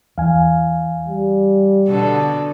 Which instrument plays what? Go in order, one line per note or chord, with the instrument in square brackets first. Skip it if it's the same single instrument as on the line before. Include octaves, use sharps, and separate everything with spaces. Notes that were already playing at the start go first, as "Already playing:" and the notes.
[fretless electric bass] E2 [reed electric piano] F5 G#5
[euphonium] G3
[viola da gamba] B2 D3 A4